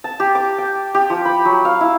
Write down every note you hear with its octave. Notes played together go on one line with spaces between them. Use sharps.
A5
G4
D6
G5
G4
F3
B5
F#3
F5
E4